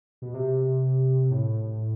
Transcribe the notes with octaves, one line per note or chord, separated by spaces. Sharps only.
B2
C3
A2